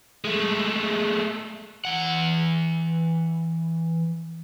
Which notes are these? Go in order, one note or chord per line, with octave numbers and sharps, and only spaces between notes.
G#3 A3
E3 F#5